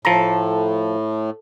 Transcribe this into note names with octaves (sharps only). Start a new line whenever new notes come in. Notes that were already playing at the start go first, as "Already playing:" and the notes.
A2 F3 A4 A#5